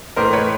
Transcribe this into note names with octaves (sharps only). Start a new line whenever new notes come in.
A2 E3 A3 A#4 C5
B4 C#5